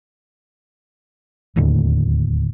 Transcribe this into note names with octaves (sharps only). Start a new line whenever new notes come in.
D1 D#2 A2 D3